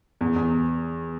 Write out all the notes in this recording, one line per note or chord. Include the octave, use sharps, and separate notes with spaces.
E2
E2